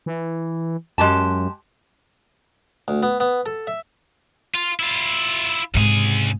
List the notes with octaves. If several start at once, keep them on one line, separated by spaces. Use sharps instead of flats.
E3
F#2 G#3 G4 A5
D2
B3
B3
A4
E5
F4
E4 F4
C#2 G#2 C3 G#4